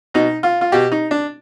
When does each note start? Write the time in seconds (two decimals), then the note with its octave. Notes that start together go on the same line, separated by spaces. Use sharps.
0.14 B2 D#4
0.43 F4
0.61 F4
0.72 B2 G4
0.92 D#4
1.11 D4